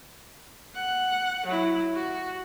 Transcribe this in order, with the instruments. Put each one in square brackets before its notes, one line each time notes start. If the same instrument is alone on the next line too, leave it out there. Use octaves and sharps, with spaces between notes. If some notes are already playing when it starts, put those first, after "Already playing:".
[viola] F#5
F#3 E4
F#4